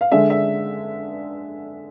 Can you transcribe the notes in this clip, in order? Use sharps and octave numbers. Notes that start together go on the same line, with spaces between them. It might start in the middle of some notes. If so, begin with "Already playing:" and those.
F5
D3 G#3 D4 E5
E5